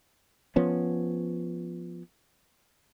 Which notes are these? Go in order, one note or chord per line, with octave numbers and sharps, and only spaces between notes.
F3 B3 C#4